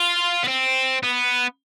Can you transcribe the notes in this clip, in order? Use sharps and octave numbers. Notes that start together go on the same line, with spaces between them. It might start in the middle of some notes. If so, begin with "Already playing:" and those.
Already playing: F4
B3
C4
B3